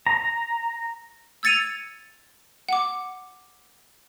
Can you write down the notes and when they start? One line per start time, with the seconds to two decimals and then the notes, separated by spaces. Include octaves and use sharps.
0.07 A#5
1.43 E6 G#6 A6 C#7 D#7 F7
2.69 F#5 D6